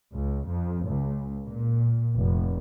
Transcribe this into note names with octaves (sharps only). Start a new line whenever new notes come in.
C#2
F2
C#2
A#2
F1